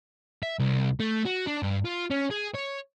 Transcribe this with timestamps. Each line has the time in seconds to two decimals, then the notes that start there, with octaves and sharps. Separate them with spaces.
0.43 E5
0.59 C2
1.00 A3
1.25 F#4
1.47 D4
1.63 G2
1.85 F4
2.11 C#4
2.31 G#4
2.55 C#5